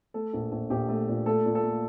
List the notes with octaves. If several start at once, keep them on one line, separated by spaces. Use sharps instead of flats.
A3 A4
A#1
A#1
A#1 G4
A3
A#2
A3 A4
A#2
A4
A3